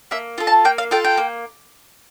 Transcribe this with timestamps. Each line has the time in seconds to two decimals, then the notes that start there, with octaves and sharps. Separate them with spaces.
0.11 A#3 E5
0.38 F4 A4
0.47 A5
0.65 A#3 G5
0.78 F5
0.91 F4 A4 G5
1.04 G5
1.17 A#3